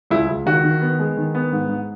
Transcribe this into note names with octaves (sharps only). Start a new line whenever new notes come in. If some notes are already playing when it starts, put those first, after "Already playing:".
C#2 E4
C#2
D#3 F#4
D#3
B3
G#3
D#3
B3
G#2
G#2